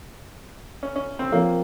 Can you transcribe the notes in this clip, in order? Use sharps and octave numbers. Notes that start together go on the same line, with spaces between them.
C#4
C#4
C4
F3 A#3 C4 F4 A#4 C#5